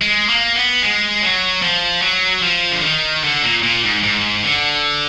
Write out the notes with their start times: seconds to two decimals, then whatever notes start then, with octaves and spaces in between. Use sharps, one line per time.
0.01 G#3
0.29 A#3
0.55 B3
0.82 G#3
1.22 F#3
1.62 F3
2.02 F#3
2.42 F3
2.72 D3
2.83 D#3
3.24 D3
3.42 A#2
3.63 A#2
3.83 G#2
4.03 G#2
4.44 D3